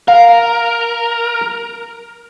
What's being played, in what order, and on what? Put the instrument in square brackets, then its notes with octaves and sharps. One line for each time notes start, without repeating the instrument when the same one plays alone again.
[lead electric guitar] A#4 [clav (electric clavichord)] F5